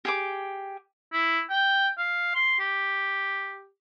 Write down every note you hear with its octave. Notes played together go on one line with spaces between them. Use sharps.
G4 G#4 D6
E4
G5
F5
C6
G4